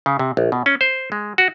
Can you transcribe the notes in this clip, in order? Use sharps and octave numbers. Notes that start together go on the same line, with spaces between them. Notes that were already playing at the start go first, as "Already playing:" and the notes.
C#3
C3
A#1
B2
C#4
C5
G#3
F#4